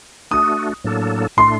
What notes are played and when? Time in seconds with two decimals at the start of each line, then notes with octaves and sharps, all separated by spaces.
0.31 A3 D4 F#4 D#6
0.84 A2 F#3 A#3 D4 A4
1.37 A2 A3 D4 C6